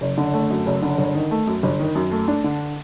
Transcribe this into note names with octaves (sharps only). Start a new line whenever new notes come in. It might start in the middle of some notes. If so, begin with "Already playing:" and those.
F#1
D3
A3
F#2
F#1
D3
G1
D#3
A3
F#2
G1
D#3
F#2
A3
D4
D3